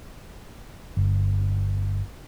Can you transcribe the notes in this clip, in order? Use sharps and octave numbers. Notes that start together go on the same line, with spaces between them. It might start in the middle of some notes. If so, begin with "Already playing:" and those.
G1